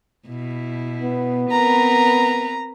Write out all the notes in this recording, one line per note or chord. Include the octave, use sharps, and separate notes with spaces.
B2 E4
B3
C4 A#4 B4 A#5